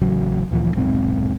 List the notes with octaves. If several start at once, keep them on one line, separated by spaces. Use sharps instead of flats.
A1 C#3 F#3
D2 A#2 E3 F3
D#1 B1 G#2 C4